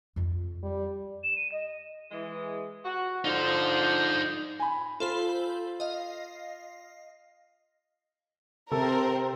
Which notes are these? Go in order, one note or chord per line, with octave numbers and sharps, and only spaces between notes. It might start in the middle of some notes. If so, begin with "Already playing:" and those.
F2 F4
G3
E7
D#7
D#5
E3 G#3
F#4
D3 F3 D#4 C5
G#5 B5
F4 A4 C5 B5
D#5 F5
C3 C4 A4 A#4